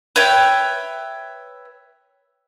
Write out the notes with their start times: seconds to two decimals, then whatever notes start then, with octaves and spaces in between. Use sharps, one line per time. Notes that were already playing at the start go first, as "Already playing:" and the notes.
0.16 B4 C#5 E5 G5